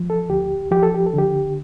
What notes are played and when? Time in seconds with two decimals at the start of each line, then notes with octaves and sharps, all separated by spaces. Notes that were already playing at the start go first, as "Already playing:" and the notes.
Already playing: F3
0.10 A4
0.30 D2 G4
0.71 F3 G4
0.83 A4
0.94 G4
1.06 A4
1.14 D3 G4